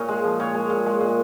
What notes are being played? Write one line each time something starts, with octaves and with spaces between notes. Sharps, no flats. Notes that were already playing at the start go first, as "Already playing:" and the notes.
Already playing: A#2 C#5 D#5
G#3
F3
A#2 C#5
G#3
A#2
G#3
A#2